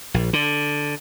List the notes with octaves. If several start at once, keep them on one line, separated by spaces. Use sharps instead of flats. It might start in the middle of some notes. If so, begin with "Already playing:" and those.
A#1
D3